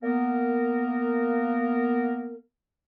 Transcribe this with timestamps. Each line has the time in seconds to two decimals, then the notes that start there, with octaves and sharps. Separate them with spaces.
0.03 A#3 B3 A#4